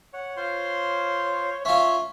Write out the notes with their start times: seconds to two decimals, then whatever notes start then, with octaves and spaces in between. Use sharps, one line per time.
0.14 C#5 F#5
0.37 F4 C5 C6
1.65 C#4 F4 E5